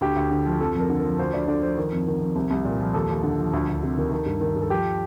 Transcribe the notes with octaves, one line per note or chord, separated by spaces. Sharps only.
D2 G4
D2
D3
F3
F2 A4
F2
A#4
D3
F3 A#4
D2 C5
D2 D5
D3 D5
F3 C5
D#3
F2
D#3
F2
C2
C2
A#2
F3
D#2 A4
D#2
D3
F3
D2
D2
C3
D#3
D#3
G2
D#3
G2
A4
F3 G4